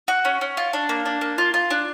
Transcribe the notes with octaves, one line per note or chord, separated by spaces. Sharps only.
F#4
C#4
C#4
F4
D4
A#3
D4
A#3
F4
F4
D4